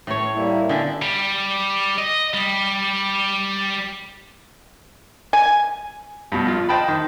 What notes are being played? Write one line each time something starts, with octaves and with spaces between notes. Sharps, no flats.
A2 C#5
G3 A#3 E4
B2 D3 E5 G5 G#5
G3
D#5
G3
G#5
G2 B2
A#1 F4
C5 D#5 G5 A5 B5
D#3